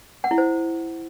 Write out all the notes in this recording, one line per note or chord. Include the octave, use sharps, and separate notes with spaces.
F#5
E4
C5